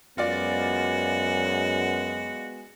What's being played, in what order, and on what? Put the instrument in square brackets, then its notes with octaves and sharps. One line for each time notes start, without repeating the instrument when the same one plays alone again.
[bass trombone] F#2 [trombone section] G#3 B3 [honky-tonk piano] F4 D5 [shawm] F#4